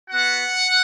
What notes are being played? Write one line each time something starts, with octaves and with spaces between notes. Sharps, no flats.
B3 F#4 F#5